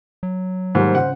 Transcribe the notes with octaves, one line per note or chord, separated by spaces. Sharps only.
F#3
G#2 D#3 G3 A#3 C5
C#3 C#4 F#5